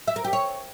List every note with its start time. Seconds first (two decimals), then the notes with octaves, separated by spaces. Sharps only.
0.08 E5
0.16 A#4
0.24 G4
0.33 C#5